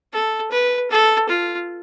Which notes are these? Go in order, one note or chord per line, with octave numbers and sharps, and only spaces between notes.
A4
B4
A4
F4